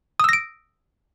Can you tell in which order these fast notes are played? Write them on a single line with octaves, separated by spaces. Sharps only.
D#6 E6 A#6 D7